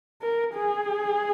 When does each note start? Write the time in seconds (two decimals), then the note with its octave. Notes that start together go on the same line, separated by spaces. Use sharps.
0.22 A#4
0.54 G#4